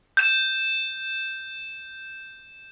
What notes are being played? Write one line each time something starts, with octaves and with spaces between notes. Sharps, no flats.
G6 E7